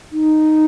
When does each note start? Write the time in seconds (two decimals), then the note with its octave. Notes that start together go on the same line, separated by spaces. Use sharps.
0.13 D#4